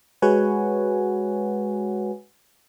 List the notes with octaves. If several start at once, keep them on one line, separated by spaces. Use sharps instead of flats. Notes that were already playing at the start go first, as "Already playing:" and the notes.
G#3 F#4 B4 C#5 F#5 G#5